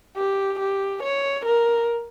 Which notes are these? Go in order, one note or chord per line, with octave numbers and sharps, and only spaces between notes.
G4
G4
C#5
A#4